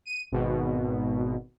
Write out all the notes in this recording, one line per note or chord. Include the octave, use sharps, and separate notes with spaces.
D#7
G#1 B2